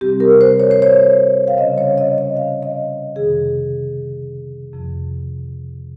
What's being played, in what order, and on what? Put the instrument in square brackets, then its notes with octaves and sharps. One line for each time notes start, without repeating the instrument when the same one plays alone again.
[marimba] C3 G3 C4 G4
A#4
C5
C#5
C5
C#5
F5
C#3 G3 C#4 D#5
C#5
D#5
D#5
F5
D#5
F2 C3 D#3 G#4
F2 C3 F3